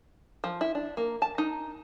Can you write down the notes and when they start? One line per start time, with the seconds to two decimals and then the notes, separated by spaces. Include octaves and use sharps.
0.44 F3
0.61 E4
0.75 D4
0.97 A#3
1.22 A5
1.38 D#4